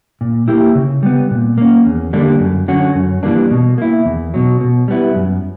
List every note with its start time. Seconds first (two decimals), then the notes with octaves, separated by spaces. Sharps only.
0.21 A#2
0.48 A#3 E4 G4
0.75 C#3
1.03 G3 B3
1.31 A#2
1.58 A#3 C#4
1.86 E2
2.13 D3 G3 A#3 D4
2.40 F#2
2.68 D3 F#3 C#4 F#4
2.95 F#2
3.23 E3 G3 A#3 D4
3.51 B2
3.78 A#3 E4
4.05 E2
4.34 B2 F#3
4.61 B2
4.88 G3 B3 E4
5.15 F#2